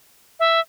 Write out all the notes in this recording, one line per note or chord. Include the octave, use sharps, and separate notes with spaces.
E5